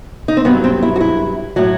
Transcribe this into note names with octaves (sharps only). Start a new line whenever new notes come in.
D#4
C4
G2 F#3 B3
C4
E4
F#4
E4
A2 F#3 F#4